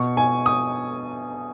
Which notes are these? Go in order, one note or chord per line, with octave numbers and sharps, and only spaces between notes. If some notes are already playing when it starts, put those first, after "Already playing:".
Already playing: B2 C#6
G#5
D#6